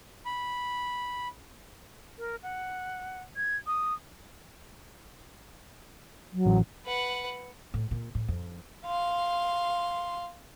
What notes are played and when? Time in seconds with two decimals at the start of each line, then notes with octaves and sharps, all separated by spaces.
0.26 B5
2.18 A#4
2.43 F#5
3.36 G#6
3.67 D#6
6.32 F#3
6.46 A1
6.86 B4 F#5
7.74 A2
7.91 A#2
8.15 A2
8.28 F2
8.86 F5 C6